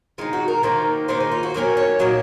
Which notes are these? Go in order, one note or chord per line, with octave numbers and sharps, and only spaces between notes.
D#3 G#3 D#4 F4
F#4
A#4
D#3 A#3 D#4 C5
D#3 A#3 D#4 C5
G#4
F4
F#4
D#3 F#3 A#3 C#4 A#4
C#5
A#2 F#3 A#3 D#5